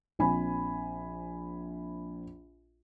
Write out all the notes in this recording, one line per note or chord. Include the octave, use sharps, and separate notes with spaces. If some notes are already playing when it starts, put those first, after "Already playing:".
A#1 C4 G#5 B5